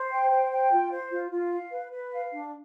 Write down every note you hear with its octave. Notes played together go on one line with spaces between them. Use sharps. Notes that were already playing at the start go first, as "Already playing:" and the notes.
Already playing: C5
G5
C5
G5
F4
C5
F4
F4
F5
B4
B4
F5
D4